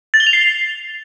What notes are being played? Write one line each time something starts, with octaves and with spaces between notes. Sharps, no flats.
A6
G7
F7
C7